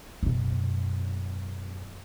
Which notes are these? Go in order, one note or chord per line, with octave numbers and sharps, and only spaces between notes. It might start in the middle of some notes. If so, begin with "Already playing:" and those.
F#2 B2